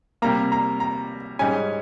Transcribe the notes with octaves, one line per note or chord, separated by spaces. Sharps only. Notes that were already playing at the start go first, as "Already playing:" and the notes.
C3 G3 A#3 A#5
A#5
A#5
G#2 G3 C#4 G#5